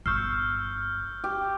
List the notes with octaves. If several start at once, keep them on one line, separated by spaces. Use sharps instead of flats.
G1 C#6 E6 F6 G6 C7
G4